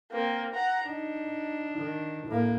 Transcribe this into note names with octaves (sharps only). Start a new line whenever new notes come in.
A#3 C4
F#5 A#5
D4 D#4
D#3
A2 A#3